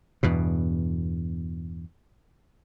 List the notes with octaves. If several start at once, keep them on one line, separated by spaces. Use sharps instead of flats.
E2 G2 B2